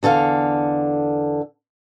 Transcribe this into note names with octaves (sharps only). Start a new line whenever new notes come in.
E2 D3 A4 F5